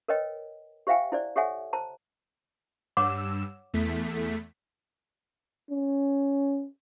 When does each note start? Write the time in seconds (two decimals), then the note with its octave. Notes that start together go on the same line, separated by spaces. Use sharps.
0.08 A#4 B4 C#5 D#5 G5
0.87 G4 C5 E5 F5 G5 G#5
1.12 E4 C5 D5
1.36 G4 A4 C#5 E5 F#5 G#5
1.73 C5 A5 A#5
2.97 G2 C#5 F#5 D6 E6
3.74 E2 A3 B6
5.70 C#4